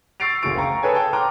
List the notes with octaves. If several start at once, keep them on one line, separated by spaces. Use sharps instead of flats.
C#6 E6 A6 C7 D7 F7
F#1 D2 C#3 F#4 C#6 D7
C5 F5 G5 A#5 C#6
G#4 A4 B4 C#5 G#5
G5 A5
G5 A#5 C6 D6 F6 F#6